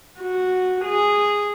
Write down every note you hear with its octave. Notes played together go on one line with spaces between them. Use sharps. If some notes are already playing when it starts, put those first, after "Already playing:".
F#4
G#4